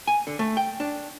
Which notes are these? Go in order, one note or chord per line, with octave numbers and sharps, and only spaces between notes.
G#5
D3
A3
G5
D4